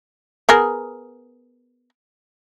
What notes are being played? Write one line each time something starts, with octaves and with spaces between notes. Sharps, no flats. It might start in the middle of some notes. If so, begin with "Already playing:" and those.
B3 G#4 A#4